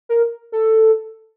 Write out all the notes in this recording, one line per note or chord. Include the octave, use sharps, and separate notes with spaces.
A#4
A4